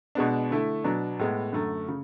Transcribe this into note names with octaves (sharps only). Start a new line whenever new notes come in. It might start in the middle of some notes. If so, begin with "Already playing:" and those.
B2 G#3 B3 D4
D3 A3 E4
B2 F#3 B3 D4
A2 G#3 B3
F#2 D3 A3
C#3